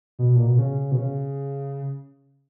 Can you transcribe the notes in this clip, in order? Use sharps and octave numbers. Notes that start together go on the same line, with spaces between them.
B2
A#2
B2
C#3
B2
C#3